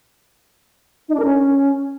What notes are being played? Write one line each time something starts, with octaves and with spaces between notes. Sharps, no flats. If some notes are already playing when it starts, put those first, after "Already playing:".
D#4
D4
A#4
C#4